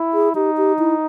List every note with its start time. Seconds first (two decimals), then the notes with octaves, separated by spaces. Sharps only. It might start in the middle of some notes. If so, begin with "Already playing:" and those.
Already playing: E4
0.14 G#4
0.35 D#4 G4
0.57 G4
0.79 E4